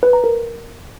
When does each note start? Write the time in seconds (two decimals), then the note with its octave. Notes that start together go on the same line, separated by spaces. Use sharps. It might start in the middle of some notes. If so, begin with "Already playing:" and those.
0.03 B4
0.13 A#5
0.24 A#4